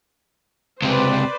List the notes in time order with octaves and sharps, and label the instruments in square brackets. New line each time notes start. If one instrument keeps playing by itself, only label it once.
[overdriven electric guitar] C#2 C3 [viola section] B4 C5 D5